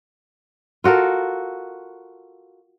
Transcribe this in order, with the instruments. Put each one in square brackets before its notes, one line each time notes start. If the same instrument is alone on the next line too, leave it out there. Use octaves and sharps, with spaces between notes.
[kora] F4 F#4 A4 A#4